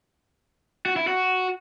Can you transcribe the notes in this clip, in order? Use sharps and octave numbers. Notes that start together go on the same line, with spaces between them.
F#4
E4
F#4